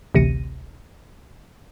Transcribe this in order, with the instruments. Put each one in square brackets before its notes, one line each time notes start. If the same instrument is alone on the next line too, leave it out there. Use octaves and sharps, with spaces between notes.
[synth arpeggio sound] A1 D2 C3 A#6 C#7 D#7